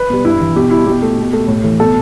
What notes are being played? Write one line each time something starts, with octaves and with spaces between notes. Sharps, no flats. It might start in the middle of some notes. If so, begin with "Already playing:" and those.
Already playing: B4
B2 G3
G2 E4
E3 G3
B2 G4
G3 E4
B2 G4
A3
B2
A3
A2
E3 A3
B2 A4